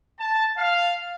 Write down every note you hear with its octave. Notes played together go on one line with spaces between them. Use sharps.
A5
F5